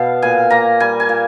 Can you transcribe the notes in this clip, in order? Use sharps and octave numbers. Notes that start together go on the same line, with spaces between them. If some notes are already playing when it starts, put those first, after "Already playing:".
Already playing: B2 B3 F5 A5
A#2 G#5
A#3 A#5
G3 G#5
G#5
A#2